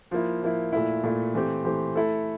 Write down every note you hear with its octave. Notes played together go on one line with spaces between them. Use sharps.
F3 A#3 E4
F3 A#3 E4
A#2 A3 E4
A#2 A3 E4
E3 A3 C4 G4
E3 A3 C4 G4
A3 E4 A4